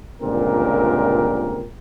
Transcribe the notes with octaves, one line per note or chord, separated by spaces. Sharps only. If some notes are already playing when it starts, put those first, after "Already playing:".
C#2 G2 A#2 D3 C4 A#4